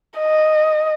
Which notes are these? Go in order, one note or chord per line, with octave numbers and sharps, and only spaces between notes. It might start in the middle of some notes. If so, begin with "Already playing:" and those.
D#5